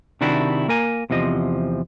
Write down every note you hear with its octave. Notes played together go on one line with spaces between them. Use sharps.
C3 D#3 D4 E4 F#4 G4
A#3 A#4 G#5
E2 C3 F3 D#5